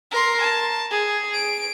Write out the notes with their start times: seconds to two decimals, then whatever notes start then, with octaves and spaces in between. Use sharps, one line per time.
0.11 A#4 C6
0.42 A5
0.91 G#4
1.34 D7